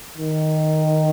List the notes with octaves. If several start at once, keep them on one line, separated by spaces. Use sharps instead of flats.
D#3